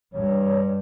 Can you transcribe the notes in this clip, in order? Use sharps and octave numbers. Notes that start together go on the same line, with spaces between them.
G2 C#5